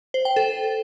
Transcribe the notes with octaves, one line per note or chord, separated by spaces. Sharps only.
C5
G5
A4